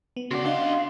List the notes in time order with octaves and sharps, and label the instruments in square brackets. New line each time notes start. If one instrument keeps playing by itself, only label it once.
[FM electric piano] B3
[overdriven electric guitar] C#3 D5 [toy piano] C#4 F#4
[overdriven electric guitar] G3 C6 [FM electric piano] D4 [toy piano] D#5 [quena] F5
[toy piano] D#5